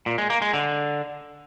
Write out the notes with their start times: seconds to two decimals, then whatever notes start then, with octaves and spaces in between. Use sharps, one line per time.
0.06 A#2
0.18 G#3
0.30 A#3
0.42 G#3
0.53 D3